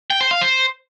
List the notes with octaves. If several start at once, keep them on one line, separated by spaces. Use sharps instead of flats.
G5
C5
F5
C5